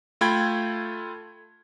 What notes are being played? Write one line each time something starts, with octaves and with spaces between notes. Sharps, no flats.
A3 F4 G5 B5 G#6